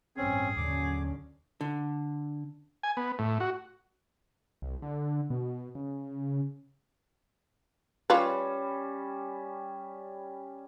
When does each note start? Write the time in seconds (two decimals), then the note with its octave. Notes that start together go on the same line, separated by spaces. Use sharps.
0.17 A1 G2 C4 C#4 G#4
0.57 D#2 D3 F#3 C#4 D6
1.61 D3
2.83 G#5
2.97 B3
3.19 A2
3.40 F#4
4.62 C2
4.82 D3
5.30 B2
5.75 C#3
8.10 G3 C#4 F4 B4